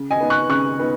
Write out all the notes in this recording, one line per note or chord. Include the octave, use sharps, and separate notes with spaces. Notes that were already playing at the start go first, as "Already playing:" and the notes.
Already playing: C#3
D#5 G#5
B3 D#4
C#6 F#6
C#3 C#6 F#6
B3 D#4